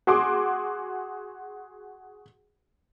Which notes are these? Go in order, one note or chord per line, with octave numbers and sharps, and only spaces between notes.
F#4 G#4 C6 D6